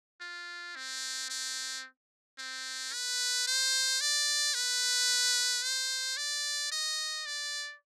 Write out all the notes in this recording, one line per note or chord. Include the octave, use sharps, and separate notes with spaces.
F4
C4
C4
C4
B4
C5
D5
B4
C5
D5
D#5
D5